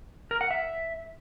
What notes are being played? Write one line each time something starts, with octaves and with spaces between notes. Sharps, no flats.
A#4
F#5
E5